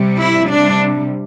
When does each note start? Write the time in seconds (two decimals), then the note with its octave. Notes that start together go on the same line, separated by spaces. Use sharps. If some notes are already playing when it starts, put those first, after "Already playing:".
Already playing: C3 G3
0.20 E4
0.53 C3 G3 D4